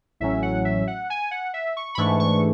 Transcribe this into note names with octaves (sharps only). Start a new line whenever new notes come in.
A1 A2 F#3 C#4 E5
F#5
E5
F#5
G#5
F#5
E5
C#6
B5
G#2 E3 A3 D4 C#6
C#6